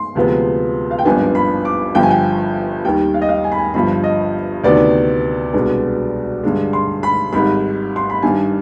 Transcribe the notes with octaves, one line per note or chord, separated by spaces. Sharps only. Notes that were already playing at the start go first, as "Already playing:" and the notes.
Already playing: C6
D2 C3 F3 G#3 B3
F5
G5
G#1 G2 F3 B3 D4 G#5
B5
D6
G1 G2 F3 G5
G#5
G5
D#2 D#3 G3 G5
F5
D#5
F5
G#5
B5
G#5
G1 G2 F3 B5
D#5
D2 C3 D#3 B3 D5
C2 B2 G#3 B3 D4
G2 D3 G#3
C6
B5
G#1 G#2 G3 B5
C6
B5
G2 D#3 G3 D4 G#5